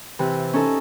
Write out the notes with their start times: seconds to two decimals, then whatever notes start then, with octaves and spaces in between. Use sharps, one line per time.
0.19 C3 E3
0.53 C#4 D#4 A4